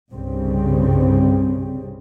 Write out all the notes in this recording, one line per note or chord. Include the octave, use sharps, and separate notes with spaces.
C2 G2 C#3 G3 C4